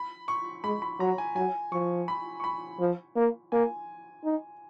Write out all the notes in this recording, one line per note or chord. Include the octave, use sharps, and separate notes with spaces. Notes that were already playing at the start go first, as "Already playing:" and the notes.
Already playing: B5
C#6
G#3 B5
B5
F#3 A#5
G#5
F#3 G#5
F3 C#6
B5
C#6
B5
F3
A#3
A#3 G#5
D#4